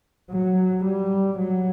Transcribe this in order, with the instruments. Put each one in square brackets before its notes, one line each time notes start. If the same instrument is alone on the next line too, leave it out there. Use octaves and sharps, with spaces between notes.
[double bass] F#3
G3
F#3